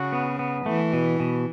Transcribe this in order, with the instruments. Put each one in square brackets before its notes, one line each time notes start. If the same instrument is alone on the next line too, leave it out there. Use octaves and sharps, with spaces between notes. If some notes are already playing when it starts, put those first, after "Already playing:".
Already playing: [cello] C#3 [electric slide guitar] F#4
[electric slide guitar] B3
B3
[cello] E3 [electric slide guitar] A3
[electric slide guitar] B2
B2